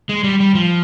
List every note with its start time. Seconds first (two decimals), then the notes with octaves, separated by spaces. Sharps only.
0.09 G#3
0.24 G3
0.40 G3
0.55 F3